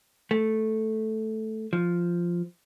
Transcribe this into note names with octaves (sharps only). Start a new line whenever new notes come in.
A3
F3